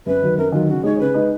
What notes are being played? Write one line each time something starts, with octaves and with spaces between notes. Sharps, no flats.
F#2 B4
D#3 F#3
F#2 A#4
D#3 F#3 F4
C#3 F#4
G#3 D#4 C#5
C#3 B4
G#3 D#4